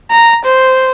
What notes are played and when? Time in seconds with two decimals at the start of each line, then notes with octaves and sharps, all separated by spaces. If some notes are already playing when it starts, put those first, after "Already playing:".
0.11 A#5
0.45 C5